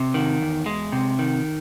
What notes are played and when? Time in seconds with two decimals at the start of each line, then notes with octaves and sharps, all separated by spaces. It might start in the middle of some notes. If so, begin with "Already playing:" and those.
Already playing: C3
0.14 D#3
0.41 E2
0.66 G#3
0.92 C3
1.19 D#3